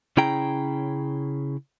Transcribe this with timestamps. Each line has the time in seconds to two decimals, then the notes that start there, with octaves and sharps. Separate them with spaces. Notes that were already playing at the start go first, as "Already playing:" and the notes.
0.17 C#3 C#4 E4 G#4 G5 A#5